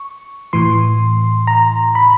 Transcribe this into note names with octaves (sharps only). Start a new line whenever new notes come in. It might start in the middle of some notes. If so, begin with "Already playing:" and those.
Already playing: C#6
A2 E3 C6
A#5
B5